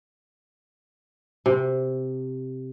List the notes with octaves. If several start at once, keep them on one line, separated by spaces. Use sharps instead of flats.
C3